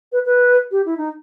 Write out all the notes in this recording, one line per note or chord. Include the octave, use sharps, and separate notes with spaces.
B4
B4
G4
E4
D#4